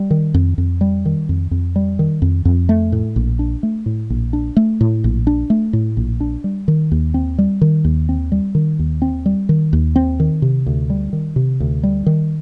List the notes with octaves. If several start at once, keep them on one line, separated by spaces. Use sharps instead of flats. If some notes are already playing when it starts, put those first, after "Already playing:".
Already playing: G3
D#3
F2
F2
G3
D#3
F2
F2
G3
D#3
F2
F2
A3
A2
A#1
D4
A3
A2
A#1
D4
A3
A2
A#1
D4
A3
A2
A#1
D4
G3
D#3
D#2
C4
G3
D#3
D#2
C4
G3
D#3
D#2
C4
G3
D#3
D#2
C4
D#3
C3
D2
G3
D#3
C3
D2
G3
D#3